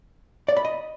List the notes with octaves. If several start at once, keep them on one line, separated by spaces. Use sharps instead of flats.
D5
B5
D#5